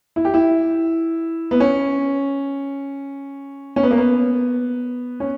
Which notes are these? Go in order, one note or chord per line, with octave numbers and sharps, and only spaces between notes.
E4
G4
E4
B3
C#4
C#4
B3
A#3
B3
C#4